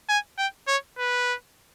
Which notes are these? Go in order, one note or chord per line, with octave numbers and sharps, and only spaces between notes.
G#5
G5
C#5
B4